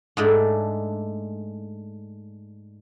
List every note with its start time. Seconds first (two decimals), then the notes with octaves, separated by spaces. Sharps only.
0.17 G#2 G#3 A3 D4